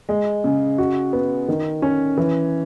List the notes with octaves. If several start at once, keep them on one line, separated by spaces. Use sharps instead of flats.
G#3
C#3
F#4
B3
D#3
C#4
E3